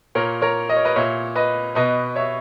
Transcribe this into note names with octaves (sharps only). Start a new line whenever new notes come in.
A#2 A#4 C#5
A#4 C#5
D#5
C#5
B4 D#5
A#2 C#5 E5
B4 D#5
B2 B4 D#5
C#5 E5